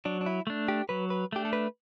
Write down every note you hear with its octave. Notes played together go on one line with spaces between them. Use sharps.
F#3 D4
D4
E4
A3 D4
G4
F#3 B4
B4
A3 D4 G4
A4
B4